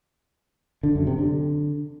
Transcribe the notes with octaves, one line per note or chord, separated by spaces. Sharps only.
D3
F#2
C3
D3